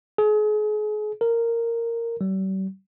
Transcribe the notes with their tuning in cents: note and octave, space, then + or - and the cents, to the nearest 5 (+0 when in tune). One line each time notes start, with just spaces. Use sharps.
G#4 +35
A#4 -10
G3 -45